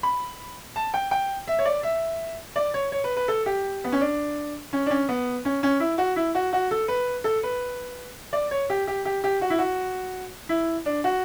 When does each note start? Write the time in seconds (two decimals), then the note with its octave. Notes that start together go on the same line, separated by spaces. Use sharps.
0.03 B5
0.76 A5
0.94 G5
1.11 G5
1.48 E5
1.59 C#5
1.65 D5
1.83 E5
2.56 D5
2.74 C#5
2.92 C#5
3.04 B4
3.17 B4
3.28 A4
3.46 G4
3.84 B3
3.92 C#4
4.01 D4
4.73 C#4
4.86 D4
4.90 C#4
5.09 B3
5.45 C#4
5.63 C#4
5.80 E4
5.98 F#4
6.16 E4
6.35 F#4
6.53 F#4
6.71 A4
6.88 B4
7.24 A4
7.43 B4
8.33 D5
8.51 C#5
8.70 G4
8.87 G4
9.05 G4
9.24 G4
9.41 F#4
9.50 E4
9.58 F#4
10.49 E4
10.86 D4
11.04 F#4